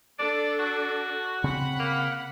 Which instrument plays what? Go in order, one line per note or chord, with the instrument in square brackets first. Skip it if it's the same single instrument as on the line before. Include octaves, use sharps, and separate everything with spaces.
[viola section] D4 A4 [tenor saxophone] D5
[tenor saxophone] F#4
[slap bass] C#3 C4 [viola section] F#5 B5
[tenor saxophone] A#3